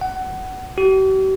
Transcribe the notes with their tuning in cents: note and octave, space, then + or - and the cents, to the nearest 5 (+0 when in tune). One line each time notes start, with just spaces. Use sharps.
F#5 +20
G4 -45